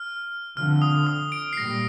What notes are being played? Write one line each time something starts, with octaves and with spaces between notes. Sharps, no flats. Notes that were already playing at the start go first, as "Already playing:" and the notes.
Already playing: F6
D3 F3 C4 F6
D#6
D#6
D7
C7
A#2 G3 A#6